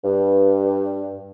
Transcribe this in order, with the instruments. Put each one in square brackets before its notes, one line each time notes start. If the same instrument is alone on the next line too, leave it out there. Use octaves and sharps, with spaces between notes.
[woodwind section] G2